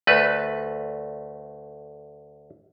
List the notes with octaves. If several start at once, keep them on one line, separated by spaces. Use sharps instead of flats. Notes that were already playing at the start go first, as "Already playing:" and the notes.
D2 A3 B4